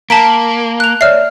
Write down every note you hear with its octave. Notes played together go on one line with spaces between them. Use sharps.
A#3 A5 A#5 B6 D7
F#7
F#6 F7
C#5 D5 E5 F6 C7